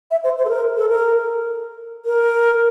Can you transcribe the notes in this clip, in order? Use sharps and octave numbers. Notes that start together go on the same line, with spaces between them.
E5
C5
C5
A4
A#4
A4
A#4
A#4